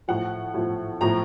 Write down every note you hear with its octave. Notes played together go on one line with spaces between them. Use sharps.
A2 F3 F#5
A2 F3
A2 F3 A#5